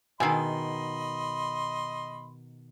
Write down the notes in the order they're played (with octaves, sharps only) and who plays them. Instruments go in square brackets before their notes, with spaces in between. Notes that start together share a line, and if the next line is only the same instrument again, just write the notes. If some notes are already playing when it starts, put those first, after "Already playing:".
[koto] B2 D#3 [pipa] G#4 E5 G#5 [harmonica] D#5 B5 C6